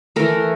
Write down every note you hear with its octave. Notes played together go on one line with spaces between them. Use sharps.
E3 A3 A#4